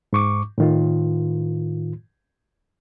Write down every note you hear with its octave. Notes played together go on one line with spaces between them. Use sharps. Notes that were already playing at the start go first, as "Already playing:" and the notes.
G#2 C#6 D6
A2 D#3 F4